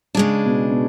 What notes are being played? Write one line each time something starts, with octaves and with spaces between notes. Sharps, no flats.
C#3 G#3 D4
B2
B2